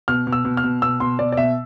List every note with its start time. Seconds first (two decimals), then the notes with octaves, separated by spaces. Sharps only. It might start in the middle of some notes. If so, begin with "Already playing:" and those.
0.08 B2 F6
0.27 B2
0.32 E6
0.45 B2
0.57 F6
0.64 B2
0.82 B2 E6
1.00 B2 C6
1.19 B2 D5
1.32 D5
1.37 B2 E5